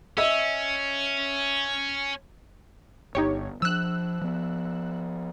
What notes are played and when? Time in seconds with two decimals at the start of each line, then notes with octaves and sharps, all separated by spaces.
0.18 C#4 D#5 E5 E6
3.15 G1 D#4 G4 C#5
3.62 F3 D4 E6 F#6
4.21 F3 B3